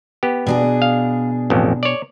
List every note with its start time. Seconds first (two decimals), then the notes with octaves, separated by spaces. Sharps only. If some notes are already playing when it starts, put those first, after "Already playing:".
0.23 B3 G4
0.47 B2 D4 G#4
0.82 F5
1.50 A1 F2
1.83 C#5 D5